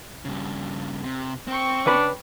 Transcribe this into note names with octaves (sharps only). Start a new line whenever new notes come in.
G2 C#3
C3
C4 G5 C#6
C#3 D4 B4 B5